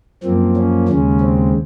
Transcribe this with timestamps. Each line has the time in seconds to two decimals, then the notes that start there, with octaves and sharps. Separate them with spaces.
0.23 F#2 F3 A#3 C4
0.56 C#4
0.88 D#2 C#3 G#3 C#4
1.21 C4